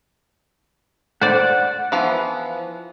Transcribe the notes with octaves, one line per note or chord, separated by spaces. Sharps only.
C5 D5 F#5
E3 F3 B3